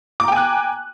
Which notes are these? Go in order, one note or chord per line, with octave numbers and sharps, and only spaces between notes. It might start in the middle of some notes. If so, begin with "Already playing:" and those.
G5 G#5 A#5 D6 F#6